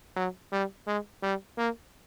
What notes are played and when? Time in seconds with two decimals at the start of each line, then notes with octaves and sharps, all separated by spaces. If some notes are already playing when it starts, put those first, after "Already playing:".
0.16 F#3
0.53 G3
0.87 G#3
1.23 G3
1.58 A#3